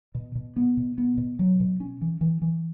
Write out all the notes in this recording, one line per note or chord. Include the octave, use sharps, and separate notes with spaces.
B2
B2
B3
B2
B3
B2
F#3
B2
C#4
E3
E3
E3